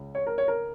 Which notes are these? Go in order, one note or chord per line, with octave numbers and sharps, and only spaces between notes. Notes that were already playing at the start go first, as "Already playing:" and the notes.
Already playing: C#2 C#3
C#5
A#4
C#5
A#4